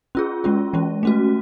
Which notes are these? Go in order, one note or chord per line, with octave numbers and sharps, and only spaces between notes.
C#4 F4 G#4
G#3 C#4 F4
E3 G#3 C#4
A3 C#4 F#4